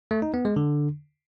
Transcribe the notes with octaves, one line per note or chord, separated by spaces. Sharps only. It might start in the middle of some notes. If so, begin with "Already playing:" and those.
A3
D#4
B3
G#3
D3